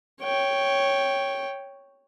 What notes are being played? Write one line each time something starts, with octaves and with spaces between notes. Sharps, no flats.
C#5 G5